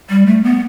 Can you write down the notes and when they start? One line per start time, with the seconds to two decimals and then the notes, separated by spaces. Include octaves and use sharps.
0.10 G3
0.26 A3
0.44 B3